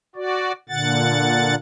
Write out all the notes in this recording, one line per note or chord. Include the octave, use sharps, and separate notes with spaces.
F#4 D5
A#2 D3 F#5 A6